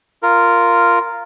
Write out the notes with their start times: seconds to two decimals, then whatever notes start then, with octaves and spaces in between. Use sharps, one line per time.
0.23 F4 A#4